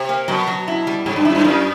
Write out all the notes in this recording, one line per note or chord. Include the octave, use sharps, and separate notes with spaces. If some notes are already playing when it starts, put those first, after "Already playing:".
Already playing: C3
A#3
B2 F#3
F#3
E4
G3
G#2 G3
G2
F#2 E4
G2
F#2 A#3